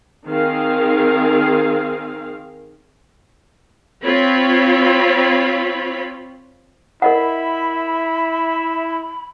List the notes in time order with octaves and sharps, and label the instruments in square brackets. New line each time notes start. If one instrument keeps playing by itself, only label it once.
[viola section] D#3 C4 G#4 F5
C4 F4 C#5 B5
[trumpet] E4 [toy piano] A#4 D#5 F#5 [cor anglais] E5 [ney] B5